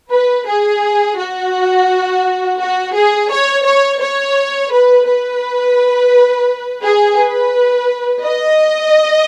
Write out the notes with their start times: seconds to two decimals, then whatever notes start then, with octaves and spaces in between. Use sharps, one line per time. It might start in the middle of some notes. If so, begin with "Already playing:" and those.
0.11 B4
0.47 G#4
1.18 F#4
2.59 F#4
2.94 G#4
3.30 C#5
3.64 C#5
4.00 C#5
4.71 B4
5.06 B4
6.83 G#4
7.18 B4
8.24 D#5